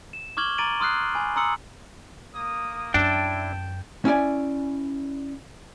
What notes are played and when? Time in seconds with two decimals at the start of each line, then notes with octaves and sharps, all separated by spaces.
0.13 E7
0.37 C#6 D6 F6 G#6 F#7 G7
0.58 A#5 D6 A6 D7 D#7 F#7
0.80 C6 D#6 F6 F#6 C7
1.15 G#5 B5
1.36 A#5 C6 D#6 E6 C#7 F#7
2.35 A#3 D#6
2.94 F#2 D4 E4 E5 G5 A5
4.05 C#4 E4 D5 G#5